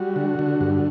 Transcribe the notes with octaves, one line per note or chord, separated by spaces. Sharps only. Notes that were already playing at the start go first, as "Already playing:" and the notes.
Already playing: G3 F#4
D3
D3
G2